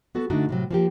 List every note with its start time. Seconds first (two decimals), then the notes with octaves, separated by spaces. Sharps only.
0.15 B3 F#4 A4
0.30 D3 A3 D4 D#4 F#4
0.49 A2 C3 F#3
0.71 F3 A#3 G4